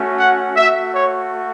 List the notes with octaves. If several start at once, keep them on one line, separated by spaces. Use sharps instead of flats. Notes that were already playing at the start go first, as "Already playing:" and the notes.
Already playing: A3 C#4 F#4
F#5
A3 F#4 E5
C#5